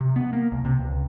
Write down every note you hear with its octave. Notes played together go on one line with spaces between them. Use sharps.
C3
B3
A#3
C2
C3
C#2